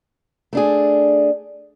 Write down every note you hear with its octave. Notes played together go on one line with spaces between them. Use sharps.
A3 D4 G#4